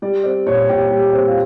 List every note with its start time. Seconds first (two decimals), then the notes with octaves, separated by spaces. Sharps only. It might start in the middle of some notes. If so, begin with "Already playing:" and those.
0.02 G3 D5
0.24 C4 D5
0.46 A#2 C#5
0.69 A#2 G4
0.91 G3
1.13 C4
1.28 F4